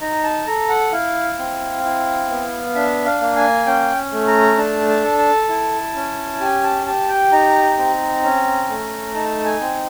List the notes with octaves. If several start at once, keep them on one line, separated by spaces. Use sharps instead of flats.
D#4 A#5
A5
A4 A#5
F#5
E4 F5
C4
E4
B3
D4 E5
F5
A#3
G#5
C#4 G5
A3
A#5
D4 A5
A5
A4
A5
E4
C#4
G4 G#5
A5
G4 A5
G5
D#4 A#5
C4
C#4
A3
D#4 A5
G#5
C4